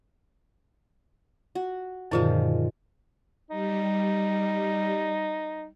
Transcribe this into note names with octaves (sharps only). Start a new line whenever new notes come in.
F#4
F#2 A#2 D3 D#3 F3 G#3
G3 D#4